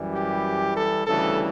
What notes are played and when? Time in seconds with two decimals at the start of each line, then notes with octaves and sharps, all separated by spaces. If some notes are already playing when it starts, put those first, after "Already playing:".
Already playing: F#2 E3 G3
0.13 G4
0.75 A4
1.06 D2 C#3 E3 G3 A4